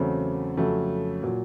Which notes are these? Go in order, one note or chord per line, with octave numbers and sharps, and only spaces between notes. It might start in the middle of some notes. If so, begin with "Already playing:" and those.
Already playing: E2 C#3 F#3 A3 C4
F2 C#3 F#3 A3
A#2 F#3